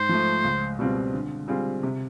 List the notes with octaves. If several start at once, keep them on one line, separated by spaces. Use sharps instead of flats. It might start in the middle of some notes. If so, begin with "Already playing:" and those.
Already playing: G#2 C5
F3 A3
C#2
B2 G3 C4 F4
D3
G3 C4 F4 G#4
C3